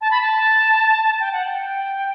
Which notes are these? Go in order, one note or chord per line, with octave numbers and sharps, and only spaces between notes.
A5
B5
A5
G5
F#5
G5